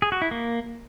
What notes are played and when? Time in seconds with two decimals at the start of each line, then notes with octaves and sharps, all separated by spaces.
0.02 G#4
0.12 F#4
0.22 E4
0.31 A#3